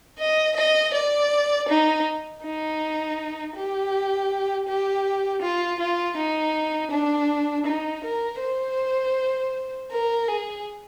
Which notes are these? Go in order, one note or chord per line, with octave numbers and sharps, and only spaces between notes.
D#5
D#5
D5
D#4
D#4
G4
G4
F4
F4
D#4
D4
D#4
A#4
C5
A#4
G#4